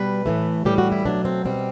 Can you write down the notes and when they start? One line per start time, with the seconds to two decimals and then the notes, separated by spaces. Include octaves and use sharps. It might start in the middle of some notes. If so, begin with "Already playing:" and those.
Already playing: B2 G3 B4
0.26 A2 E3 A3
0.65 A2 E3 G3 G4
0.78 F#4
0.92 E4
1.05 B2 F#3 A3 D4
1.25 C4
1.45 B2 G3 C4